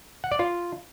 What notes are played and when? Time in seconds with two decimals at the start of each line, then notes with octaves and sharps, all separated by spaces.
0.24 F#5
0.32 D5
0.39 F4